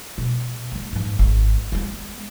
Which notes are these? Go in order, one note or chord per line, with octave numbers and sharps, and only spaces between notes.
B2
A3 B3
G#2 E3
G#1
G#3 B3